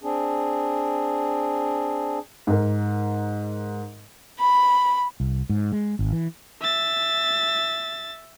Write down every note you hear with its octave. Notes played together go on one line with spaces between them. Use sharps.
C4 D4 G#4
G#2 A#4
B5
C2
G#2
G#3
G#1
E3
E5 A6